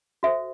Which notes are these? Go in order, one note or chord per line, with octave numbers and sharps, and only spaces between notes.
F#4 A4 C5 E5